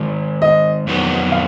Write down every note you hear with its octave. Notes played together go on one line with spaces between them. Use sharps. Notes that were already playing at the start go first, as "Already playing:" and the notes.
Already playing: D#3 G#3 D#4 A#4 C#5
D#5
F2 D#3 F#3 B3
F5